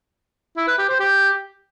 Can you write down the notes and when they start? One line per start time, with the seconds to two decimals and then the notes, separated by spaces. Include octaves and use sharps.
0.57 E4
0.68 B4
0.78 G4
0.89 C5
1.00 G4